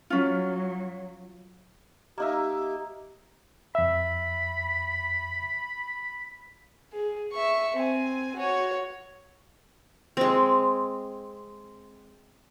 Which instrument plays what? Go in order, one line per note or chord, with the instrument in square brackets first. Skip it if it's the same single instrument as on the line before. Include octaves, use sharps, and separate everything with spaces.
[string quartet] F#3 [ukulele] C#4 F4
[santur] A#3 D#4 E5 [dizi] G4
[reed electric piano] F2 E5 [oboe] B5
[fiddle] G#4
E5 C#6
C4 G#5
F#4 C#5
[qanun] G#3 C4